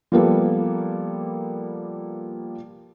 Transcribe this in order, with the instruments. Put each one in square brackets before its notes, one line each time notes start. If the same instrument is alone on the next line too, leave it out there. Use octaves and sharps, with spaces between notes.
[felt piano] F3 G3 A#3 B3 A4